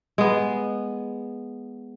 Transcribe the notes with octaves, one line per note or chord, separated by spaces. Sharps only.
G#3 B3